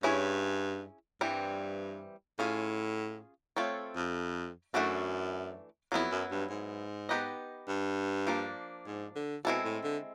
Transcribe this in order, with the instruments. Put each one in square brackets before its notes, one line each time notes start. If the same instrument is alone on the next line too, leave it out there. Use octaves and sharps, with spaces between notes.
[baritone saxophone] G2 [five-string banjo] C#4 E4 G#4 C#5
[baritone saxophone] G2 [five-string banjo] E3 G3 C4
[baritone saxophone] A2 [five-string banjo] C#4 F4 G#4
[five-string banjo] A3 C4 F4 A4 C#5
[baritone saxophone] F2
[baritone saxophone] F#2 [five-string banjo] E3 A3 D4 F#4 A4
[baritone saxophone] F2 [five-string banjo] F#3 B3 E4
[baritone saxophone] F#2
G2
G#2
[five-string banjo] B3 D#4 G4 B4 D#5
[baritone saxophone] G2
[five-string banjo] F3 A#3 D4
[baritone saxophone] G#2
D3
[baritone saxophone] B2 [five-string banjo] G#3 C4 E4 A4
[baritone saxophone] A2
D3